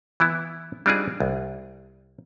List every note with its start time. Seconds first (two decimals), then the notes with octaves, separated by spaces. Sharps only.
0.20 E3 B3 E4
0.86 G3 C4 D4 D#4 F4 G#4
1.20 C2